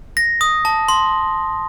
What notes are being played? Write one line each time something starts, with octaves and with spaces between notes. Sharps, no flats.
A#6
D#6
A5
C6